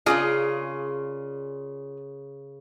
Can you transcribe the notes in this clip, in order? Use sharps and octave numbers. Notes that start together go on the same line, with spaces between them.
C#3 C#4 F4 G#4 A#4 D5